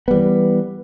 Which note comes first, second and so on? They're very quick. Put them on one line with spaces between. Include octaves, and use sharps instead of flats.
B3 G3 E3